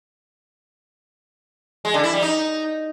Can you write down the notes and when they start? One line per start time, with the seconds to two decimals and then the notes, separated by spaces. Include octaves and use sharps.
1.85 G#3
1.94 D3
2.04 E4
2.13 G3
2.22 D#4